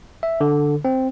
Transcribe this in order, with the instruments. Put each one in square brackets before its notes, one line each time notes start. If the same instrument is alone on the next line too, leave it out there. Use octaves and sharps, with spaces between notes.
[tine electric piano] E5
D3
C4